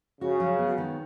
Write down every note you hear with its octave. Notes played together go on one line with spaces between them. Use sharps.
C#3 F#4
F#3
B3
D#3